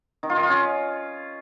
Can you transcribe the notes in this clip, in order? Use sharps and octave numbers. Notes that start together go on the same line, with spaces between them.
D#3
F4
D#3
F4
C#4